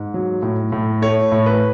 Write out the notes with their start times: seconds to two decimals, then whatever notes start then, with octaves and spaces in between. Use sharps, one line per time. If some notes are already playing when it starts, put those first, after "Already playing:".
Already playing: G#2
0.14 F#3
0.42 A2
0.72 A2
1.02 A3 C#5
1.32 A2
1.46 B4